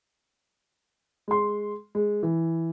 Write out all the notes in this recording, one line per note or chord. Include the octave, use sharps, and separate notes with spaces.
G#3 C6
G#3
E3